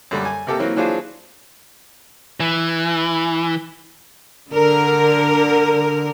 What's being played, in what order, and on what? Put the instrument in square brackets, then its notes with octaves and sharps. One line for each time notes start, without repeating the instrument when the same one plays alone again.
[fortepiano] F#2 D3 G3
G#5
C3 A#3 G4 A4 A#4
E3 F#3 A#3 C4
E3 F#3 D4 F4 G#4 C5
[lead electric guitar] E3
[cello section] D3 A#4